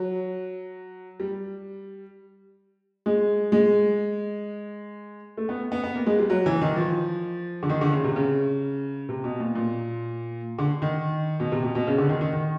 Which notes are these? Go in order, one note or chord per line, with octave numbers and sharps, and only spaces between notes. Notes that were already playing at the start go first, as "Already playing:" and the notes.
Already playing: F#3
G3
G#3
G#3
A3
B3
B3
B3
A#3
G#3
G3
F#3
E3
D#3
F3
D3
D#3
D3
C#3
C3
C#3
C3
B2
A#2
A#2
D3
D#3
B2
C3
B2
B2
C#3
D3
D#3
D#3
D#3